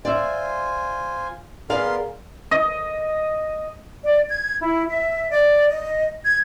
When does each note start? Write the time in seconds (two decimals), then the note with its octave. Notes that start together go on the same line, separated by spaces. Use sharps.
0.05 F4 C5 D5 E5 G#5
1.70 B3 G#4 A#4 D5 F5 C6
2.51 D#5
4.04 D5
4.29 G#6
4.60 E4
4.90 E5
5.30 D5
5.68 D#5
6.24 G#6